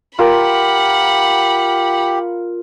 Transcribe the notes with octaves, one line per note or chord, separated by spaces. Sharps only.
F4 G4 A#4 F#5 B5